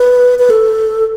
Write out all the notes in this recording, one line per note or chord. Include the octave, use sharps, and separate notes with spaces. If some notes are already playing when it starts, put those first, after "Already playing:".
Already playing: B4
B4
A4